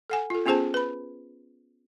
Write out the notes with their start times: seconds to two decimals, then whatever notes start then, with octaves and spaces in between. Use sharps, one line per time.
0.10 A4 F#5 G#5
0.30 F4 A4
0.46 B3 C#4 F4 G#4 C5 A5
0.74 B4 B5